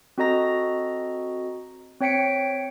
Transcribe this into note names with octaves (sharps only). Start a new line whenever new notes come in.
C4 F#4 A4 D#5 A#5 A#6
C4 C#5 G5 B6 C#7 D7